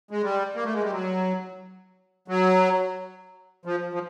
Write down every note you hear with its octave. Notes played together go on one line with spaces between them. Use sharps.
G#3
G3
A#3
A3
G#3
G3
F#3
F#3
F3
F3